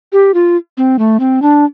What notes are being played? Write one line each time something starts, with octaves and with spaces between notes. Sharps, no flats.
G4
F4
C4
A3
C4
D4